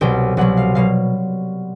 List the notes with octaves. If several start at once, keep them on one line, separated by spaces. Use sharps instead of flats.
C2 B2 F#3 G5
C2 B2 F#3 F#5
F5
B2 F#3 F5